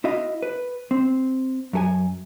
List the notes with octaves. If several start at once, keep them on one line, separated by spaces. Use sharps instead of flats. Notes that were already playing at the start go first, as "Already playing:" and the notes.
E4 F#4 D#5 F5
B4
C4
F#2 A4 G#5